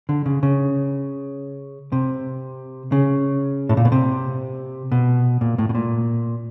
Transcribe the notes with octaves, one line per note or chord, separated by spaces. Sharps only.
D3
C#3
C#3
C3
C#3
A2
A#2
B2
C3
B2
A#2
A2
B2
A#2